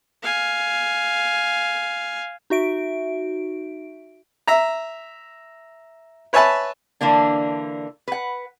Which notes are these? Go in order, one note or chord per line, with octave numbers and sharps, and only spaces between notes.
F5 G#5
D#4 F#4 E5 D7
E5 A#5
B4 C#5 E5 G#5 A5 B5
D3 E3 A#3 D4
B4 F#5